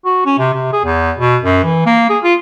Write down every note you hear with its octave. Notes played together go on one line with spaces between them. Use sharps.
F#4
C#4
C3
C3
G#4
E2
B2
F#2
E3
A#3
G#4
F4